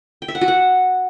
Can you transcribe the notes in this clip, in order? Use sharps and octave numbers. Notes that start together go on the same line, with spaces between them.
G5
E5
F#5
F#4
F#5